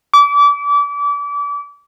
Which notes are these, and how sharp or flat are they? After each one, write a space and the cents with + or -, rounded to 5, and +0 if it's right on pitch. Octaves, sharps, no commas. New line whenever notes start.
D6 -30